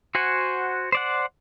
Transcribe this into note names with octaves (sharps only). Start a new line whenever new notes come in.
F#4 C5 F#5 G#5
C5 D5 F#5